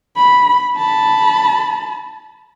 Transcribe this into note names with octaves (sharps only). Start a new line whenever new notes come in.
B5
A5 B5